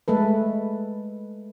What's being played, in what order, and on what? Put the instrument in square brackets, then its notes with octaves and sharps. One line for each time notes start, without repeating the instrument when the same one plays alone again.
[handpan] G#3 A3 A4 B4